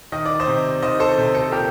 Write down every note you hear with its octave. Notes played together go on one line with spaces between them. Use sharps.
D#3 D#5
D5
C5 D#5
C3
D#3 C5 D#5
A4 C5
C3
A4 C5
A#2 G4 A#4